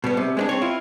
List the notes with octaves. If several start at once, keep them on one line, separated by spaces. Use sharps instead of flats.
B2 G3 B3
C3
G#3 B3 D4
C4 C#5
E4 F4